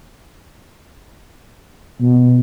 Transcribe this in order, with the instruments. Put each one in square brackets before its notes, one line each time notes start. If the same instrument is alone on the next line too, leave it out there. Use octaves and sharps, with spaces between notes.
[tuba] B2